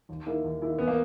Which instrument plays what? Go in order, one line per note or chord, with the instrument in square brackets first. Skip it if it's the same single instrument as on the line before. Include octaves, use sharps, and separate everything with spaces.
[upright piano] D#2
D#3 A#3 E4
D#2
D#3 A#3 E4
[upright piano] E2 [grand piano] B3
[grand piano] A#3